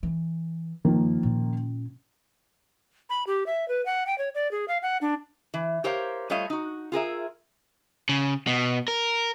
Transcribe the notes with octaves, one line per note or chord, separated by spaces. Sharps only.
E3
G2 D#3 F3 A#3
A#2 C#4
B5
G4
E5
B4
F#5
G5
C#5
D5
G#4
F5
F#5
D4
E3
G4 A#4 C5 C#5 F5
G3 A3 F4 C#5 D#5 F5
D#4 F#4
F4 G#4 A#4 E5
C#3
B2
A#4